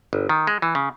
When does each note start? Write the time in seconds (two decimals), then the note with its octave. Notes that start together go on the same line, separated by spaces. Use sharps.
0.13 G1
0.29 D#3
0.47 G#3
0.62 E3
0.75 C#3